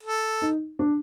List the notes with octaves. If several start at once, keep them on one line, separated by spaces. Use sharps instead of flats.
A4
D#4
D4